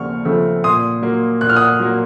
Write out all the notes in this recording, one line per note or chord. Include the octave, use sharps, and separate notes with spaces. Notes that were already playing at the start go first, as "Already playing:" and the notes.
Already playing: D#2 C#3 F3 A3 C4 C#6 F6
C#3 F3 A3 C4
A#2 C6 D#6
F#3 A#3
A#2 F#6
F6
D#6 F#6
F#3 A#3